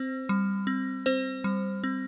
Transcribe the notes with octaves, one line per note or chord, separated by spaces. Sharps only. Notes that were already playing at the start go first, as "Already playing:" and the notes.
Already playing: C4 C5
G3
C4
C4 C5
G3
C4